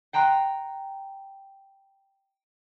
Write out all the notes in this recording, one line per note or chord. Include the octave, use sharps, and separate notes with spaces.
F#5 G5 A#5 C6 F#6